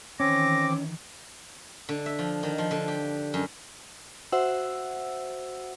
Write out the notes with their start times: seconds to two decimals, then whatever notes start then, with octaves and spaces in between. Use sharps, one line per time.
0.20 D#3 E3 C4 C#4 D6 A#6
1.89 D3
2.06 E5
2.19 F3
2.43 D#3
2.58 F3
2.71 D3
2.88 G4
3.34 F#2
4.32 F#4 C5 E5 F#5 E6